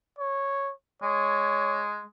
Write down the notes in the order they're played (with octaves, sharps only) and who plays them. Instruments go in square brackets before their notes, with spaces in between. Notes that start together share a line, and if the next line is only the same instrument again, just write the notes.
[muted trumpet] C#5
[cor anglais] G#3 [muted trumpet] C#5